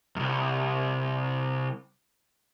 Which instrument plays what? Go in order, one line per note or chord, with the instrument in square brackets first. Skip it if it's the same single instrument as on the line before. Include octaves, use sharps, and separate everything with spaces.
[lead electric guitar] C2 F#2